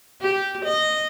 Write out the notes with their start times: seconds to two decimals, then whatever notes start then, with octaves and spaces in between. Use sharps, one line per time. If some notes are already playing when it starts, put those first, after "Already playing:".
0.22 G4
0.65 D#5